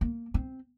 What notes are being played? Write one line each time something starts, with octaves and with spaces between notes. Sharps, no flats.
A#3
C4